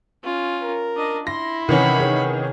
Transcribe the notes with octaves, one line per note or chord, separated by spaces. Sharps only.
C#4 F4
A#4
D4 D#5
E4 C6 A#6
C3 D#3 E3 C#4 F#5 B5
G#4 C#5